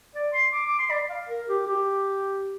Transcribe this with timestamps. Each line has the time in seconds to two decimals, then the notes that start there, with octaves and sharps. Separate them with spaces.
0.15 D5
0.33 C6
0.52 D6
0.66 D6
0.79 C6
0.91 D5
1.10 F5
1.29 A#4
1.49 G4
1.67 G4